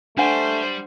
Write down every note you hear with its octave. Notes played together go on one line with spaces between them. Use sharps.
G3 A3 D4 C5 F#5